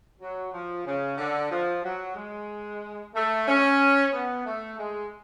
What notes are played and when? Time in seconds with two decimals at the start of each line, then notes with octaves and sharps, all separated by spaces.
0.20 F#3
0.52 F3
0.85 C#3
1.18 D3
1.50 F3
1.83 F#3
2.15 G#3
3.14 A3
3.46 C#4
4.11 B3
4.45 A3
4.77 G#3